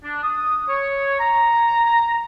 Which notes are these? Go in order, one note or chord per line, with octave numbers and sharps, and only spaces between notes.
D4
D#6
C#5
A#5